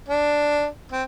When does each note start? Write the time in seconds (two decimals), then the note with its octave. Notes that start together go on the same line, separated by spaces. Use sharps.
0.08 D4
0.92 C4